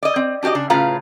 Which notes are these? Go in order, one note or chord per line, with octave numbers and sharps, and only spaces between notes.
D5 D#5
C4
D4 F#4 G4 D5 D#5
C#3 D4
A2 C#3 F4 B4 F5 A#5